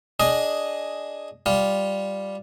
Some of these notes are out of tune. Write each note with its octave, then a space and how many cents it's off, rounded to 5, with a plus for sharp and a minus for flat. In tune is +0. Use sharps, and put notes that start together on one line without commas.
D4 -10 G#4 +0 D#5 +0
G3 +0 F4 +0